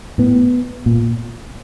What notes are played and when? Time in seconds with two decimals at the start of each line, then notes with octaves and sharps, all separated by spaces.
0.18 A2 B3
0.86 A#2